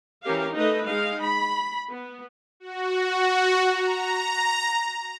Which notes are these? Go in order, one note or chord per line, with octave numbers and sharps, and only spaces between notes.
E3 C#4 G4 A#4 F5
A3 D#4 B4 D#5
G#3 D#4 F5
B5
B3
F#4
A#5